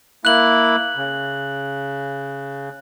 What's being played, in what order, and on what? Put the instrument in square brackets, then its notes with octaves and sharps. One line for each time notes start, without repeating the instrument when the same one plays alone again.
[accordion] A#3 E4 [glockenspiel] F#6 F#7
[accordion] C#3